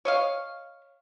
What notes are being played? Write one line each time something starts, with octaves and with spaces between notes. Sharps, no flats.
C#5 D#5 F5